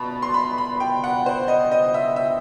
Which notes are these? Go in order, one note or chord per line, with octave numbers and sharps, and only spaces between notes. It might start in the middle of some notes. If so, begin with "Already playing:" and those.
Already playing: B2 A5 B5
C6
B5
B5
G5
F#5
C5
D#5
D#5
E5
E5